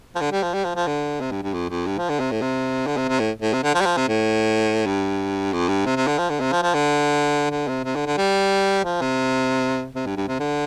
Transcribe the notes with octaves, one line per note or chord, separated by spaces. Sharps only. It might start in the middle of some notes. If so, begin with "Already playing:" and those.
F3
D3
G3
F3
G3
F3
F3
D3
C3
G2
G2
F2
F2
G2
F3
D3
C3
A2
C3
D3
C3
C3
A2
A2
C3
D3
F3
G3
F3
C3
A2
G2
F2
G2
C3
C3
D3
F3
D3
C3
F3
F3
D3
D3
C3
C3
D3
D3
G3
F3
C3
C3
G2
G2
C3
D3